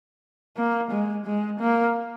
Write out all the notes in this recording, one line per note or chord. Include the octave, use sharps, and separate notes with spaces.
A#3
G#3
G#3
A#3